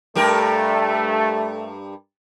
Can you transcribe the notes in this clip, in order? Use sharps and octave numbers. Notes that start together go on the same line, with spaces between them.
G2 A3 G4 A#4